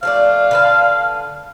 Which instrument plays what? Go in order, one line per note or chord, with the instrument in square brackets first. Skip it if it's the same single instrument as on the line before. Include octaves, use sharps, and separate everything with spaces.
[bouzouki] F3 A3 D4 [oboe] F5
[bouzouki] D3 B4 A5